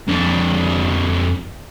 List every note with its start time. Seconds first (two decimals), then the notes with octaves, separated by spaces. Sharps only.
0.08 F2 D4